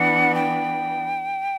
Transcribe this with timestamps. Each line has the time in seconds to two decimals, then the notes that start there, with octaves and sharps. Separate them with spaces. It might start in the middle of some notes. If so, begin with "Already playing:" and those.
Already playing: E3 B3 D4 F#5
0.35 G5